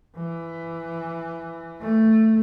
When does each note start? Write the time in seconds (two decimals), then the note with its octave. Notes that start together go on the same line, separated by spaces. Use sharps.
0.16 E3
1.81 A3